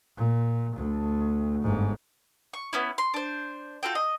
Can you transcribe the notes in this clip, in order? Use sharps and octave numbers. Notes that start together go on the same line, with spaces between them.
A#2
D2
G1 G#2
C#6
B3 C#4 E4
C6
D4 C5
F4 F#4 A4 G5
D#5